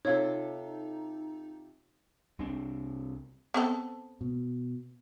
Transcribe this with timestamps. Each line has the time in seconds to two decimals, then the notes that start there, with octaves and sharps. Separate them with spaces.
0.05 C3 D#4 F4 A4 C#5
2.39 C2 C3 C4 D4
3.54 B3 C4 A4
4.21 B2